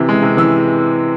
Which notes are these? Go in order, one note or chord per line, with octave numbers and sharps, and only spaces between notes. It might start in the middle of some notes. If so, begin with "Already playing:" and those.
Already playing: C3 E3
G#3
C3
E3 E6